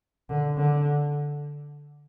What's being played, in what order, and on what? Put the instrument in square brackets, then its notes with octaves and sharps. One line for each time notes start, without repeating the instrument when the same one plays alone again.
[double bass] D3
D3